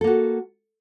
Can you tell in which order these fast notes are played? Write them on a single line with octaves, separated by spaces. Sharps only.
A4 A#3 F#4